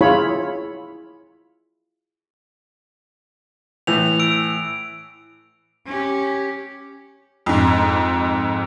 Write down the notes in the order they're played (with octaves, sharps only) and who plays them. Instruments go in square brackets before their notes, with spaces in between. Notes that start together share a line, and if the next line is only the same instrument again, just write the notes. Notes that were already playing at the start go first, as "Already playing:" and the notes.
[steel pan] E4 F4 G#4 C#5 B5
[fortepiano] A2 E3 [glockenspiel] F7
[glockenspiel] E6 D7
[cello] C#4 G4
[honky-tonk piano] F2 G#2